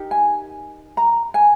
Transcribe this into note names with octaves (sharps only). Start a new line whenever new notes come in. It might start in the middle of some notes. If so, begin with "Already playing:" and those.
Already playing: D#4 G4 A#4
G#5
A#5
G#5